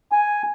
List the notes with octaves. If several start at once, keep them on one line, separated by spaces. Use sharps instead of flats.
G#5